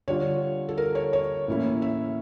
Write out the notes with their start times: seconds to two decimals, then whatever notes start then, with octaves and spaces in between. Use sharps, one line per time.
0.08 D3 G3 D4 F4 C#5
0.69 A4
0.78 A#4
0.95 C#5
1.13 C#5
1.48 A2 E3 A#3 C#4 E4
1.82 E5